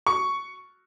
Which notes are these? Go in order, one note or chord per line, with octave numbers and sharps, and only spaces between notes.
C#6